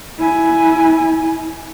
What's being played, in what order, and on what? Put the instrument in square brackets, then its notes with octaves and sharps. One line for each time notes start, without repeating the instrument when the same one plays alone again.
[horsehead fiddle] E4 G#5